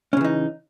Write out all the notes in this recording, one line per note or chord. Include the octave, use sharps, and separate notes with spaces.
C#3 E3 C#4 D#4